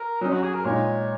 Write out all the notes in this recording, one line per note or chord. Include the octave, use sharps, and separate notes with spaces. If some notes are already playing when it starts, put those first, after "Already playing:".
Already playing: A#4
F#3 C#4 D#4
F#4
G#4
A#4
A#2 G#3 D#4 C#5